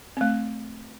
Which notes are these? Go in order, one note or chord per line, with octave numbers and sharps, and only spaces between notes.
A3 C4